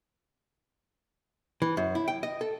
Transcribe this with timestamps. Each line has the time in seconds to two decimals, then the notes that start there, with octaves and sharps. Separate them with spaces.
1.62 E3
1.77 F#2
1.95 E4
2.08 G5
2.23 D#5
2.41 A4